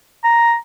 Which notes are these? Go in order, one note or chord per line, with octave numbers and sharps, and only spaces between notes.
A#5